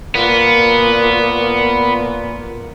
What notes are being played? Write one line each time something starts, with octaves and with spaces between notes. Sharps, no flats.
A#2 B3